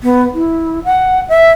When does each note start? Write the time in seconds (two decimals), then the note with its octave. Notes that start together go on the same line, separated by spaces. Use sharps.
0.03 B3
0.34 E4
0.85 F#5
1.29 E5